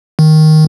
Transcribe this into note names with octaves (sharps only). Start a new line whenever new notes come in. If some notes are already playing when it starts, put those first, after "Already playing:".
D#3